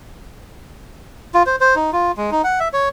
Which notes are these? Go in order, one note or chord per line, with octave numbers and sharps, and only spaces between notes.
F4
C5
C5
D#4
F4
G#3
D#4
F#5
E5
C#5